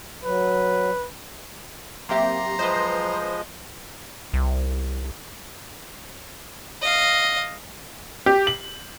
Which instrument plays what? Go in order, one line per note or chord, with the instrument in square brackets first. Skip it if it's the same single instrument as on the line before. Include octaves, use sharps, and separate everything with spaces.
[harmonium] F#3 [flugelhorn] B4
[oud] F#3 E5 [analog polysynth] A#3 C4 G4 [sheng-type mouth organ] A#5 C6
[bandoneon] F3 G#3 D#5 [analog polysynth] B4 C5
[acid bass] C2
[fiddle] D#5 F5
[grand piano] G4
F#7